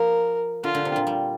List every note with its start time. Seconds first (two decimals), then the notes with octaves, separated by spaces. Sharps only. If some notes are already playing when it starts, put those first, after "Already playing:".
Already playing: F3 A#4
0.64 D3 F4
0.74 D3
0.85 C3
0.96 A#2
1.07 G3